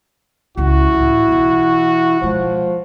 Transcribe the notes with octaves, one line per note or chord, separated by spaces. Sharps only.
C#2 C#4 E4 F#4
A1
B1 E3
B2 F3 G#3